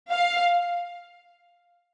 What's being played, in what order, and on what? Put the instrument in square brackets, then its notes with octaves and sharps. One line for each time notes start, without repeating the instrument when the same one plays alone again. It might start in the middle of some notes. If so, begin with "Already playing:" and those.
[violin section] F5